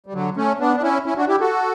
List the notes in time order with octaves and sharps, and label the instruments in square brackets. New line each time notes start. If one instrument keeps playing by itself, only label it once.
[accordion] G3
D3 F#3
A3 C#4
B3 D4
D4
C#4 E4
C#4 E4
D4 F#4
E4 G4
F#4 A4